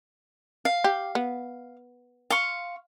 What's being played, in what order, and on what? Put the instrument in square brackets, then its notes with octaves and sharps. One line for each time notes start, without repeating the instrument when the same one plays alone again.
[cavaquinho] F5
[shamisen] G4
B3
[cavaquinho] F5 C6 C#6